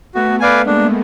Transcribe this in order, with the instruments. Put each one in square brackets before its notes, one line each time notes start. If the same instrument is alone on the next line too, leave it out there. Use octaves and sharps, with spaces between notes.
[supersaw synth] A3 B3 [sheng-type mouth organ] F#4
[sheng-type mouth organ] B4 D5 F5 G#5
[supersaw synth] G#3 A#3 [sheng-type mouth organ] D4